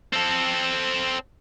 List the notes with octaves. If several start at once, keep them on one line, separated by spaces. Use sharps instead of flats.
C4 A4